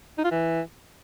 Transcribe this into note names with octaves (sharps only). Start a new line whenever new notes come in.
D#4
F4
E3